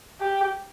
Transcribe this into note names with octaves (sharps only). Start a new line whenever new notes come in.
G4